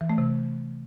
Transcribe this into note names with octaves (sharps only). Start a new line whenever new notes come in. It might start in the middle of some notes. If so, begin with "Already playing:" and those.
E3
A3
C3